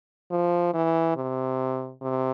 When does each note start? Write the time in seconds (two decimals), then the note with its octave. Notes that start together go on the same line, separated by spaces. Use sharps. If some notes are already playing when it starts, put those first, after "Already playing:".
0.31 F3
0.74 E3
1.16 C3
2.03 C3